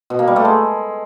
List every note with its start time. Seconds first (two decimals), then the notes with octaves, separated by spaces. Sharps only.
0.10 B2
0.19 A#3
0.27 G3
0.36 A3
0.45 G#3